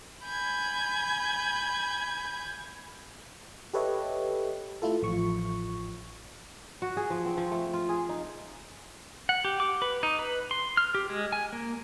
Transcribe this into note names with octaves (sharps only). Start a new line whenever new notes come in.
G#5 B5 G6 G#6
G4 A4 B4 C#5 D#5 E5
A3 E4 F4 A4
A1 F3 C#6
F#4
G#4
F3
C4
F3
A3
F4
G#4
D#4
F#5
G4
D6
B4
D#4
B4
C6
F6
G4
G#3
G#5
A#3